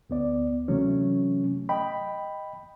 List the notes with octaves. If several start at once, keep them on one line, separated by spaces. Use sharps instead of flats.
D2 B3 D5
C3 E3 F#3 A3 C#4
D#5 G5 B5